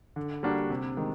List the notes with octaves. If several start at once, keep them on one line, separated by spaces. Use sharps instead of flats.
D3
G3 A#3 D4 F#4
C3
D#3 G#3